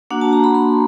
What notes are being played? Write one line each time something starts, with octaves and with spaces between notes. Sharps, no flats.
A#3 D4 F#4 F#5
A5
A#5
B5
C6